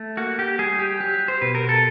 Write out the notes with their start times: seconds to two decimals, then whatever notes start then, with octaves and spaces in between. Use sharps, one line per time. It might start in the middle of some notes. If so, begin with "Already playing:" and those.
Already playing: A3
0.17 A#3 F#4
0.39 G4
0.58 G3 G#4
0.79 G4
1.00 F#3 G4
1.28 C5
1.41 B2 B4
1.55 A#4
1.69 A4